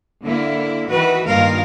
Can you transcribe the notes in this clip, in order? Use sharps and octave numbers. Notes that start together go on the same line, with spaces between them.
D3 A#3 E4
D#3 E3 F#4 B4
G2 D#3 A#3 F4 A#4 F5